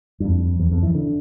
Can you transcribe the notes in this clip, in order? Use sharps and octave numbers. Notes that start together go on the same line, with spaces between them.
G2
F2
E2
F2
E3
D3